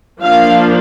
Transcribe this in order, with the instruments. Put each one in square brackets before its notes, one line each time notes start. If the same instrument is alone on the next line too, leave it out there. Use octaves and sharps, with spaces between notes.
[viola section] F3 A#3 D4 F5